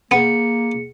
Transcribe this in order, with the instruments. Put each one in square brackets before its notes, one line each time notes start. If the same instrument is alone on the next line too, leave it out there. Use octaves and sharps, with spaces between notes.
[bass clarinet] A#3 [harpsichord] B3 [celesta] G#4 C#7